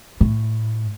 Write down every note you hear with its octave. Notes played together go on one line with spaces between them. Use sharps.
A2